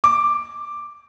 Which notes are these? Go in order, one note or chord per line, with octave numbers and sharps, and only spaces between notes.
D6